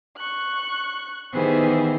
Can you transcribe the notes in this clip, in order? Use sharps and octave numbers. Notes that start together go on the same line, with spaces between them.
C#6 F#6
D#3 E3 B3 G4 G#4 C5